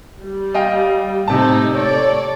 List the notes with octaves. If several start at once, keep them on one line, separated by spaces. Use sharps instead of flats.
G3
D#5 F5 G5
A2 C3 C4 D#4 A5
A4 C#5 D5